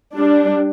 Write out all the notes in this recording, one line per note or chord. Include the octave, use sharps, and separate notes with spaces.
G3 D4